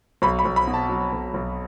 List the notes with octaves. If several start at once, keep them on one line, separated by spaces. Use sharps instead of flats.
B1 B5
B5
B1
B5
B2
A5
F#3
B1
B1